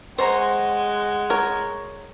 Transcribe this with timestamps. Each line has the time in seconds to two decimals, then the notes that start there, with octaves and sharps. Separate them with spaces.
0.18 G#3 C5 C#5 F#5 A#5
1.30 A#4 C#5